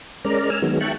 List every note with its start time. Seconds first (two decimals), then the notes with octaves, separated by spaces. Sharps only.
0.25 G#3 C#4 A#4 D5 A#5
0.50 G#5 E6 F6
0.62 D#3 F#3 G#3 B3
0.81 E5 G5 A5 C#6 F#6